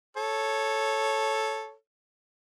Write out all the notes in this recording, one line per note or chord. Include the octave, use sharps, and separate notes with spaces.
A4 C#5